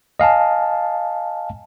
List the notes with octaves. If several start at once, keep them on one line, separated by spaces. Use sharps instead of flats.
D#5 F5 G#5 A5